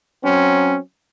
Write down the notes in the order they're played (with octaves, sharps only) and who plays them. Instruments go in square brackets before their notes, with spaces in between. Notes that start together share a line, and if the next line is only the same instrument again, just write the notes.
[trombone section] F#3 C4 C#4